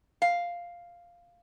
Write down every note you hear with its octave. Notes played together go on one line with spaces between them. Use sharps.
F5